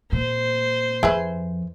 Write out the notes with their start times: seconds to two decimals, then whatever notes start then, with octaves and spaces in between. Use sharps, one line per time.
0.12 A#2 C5
1.03 F2 E4 G#4 B4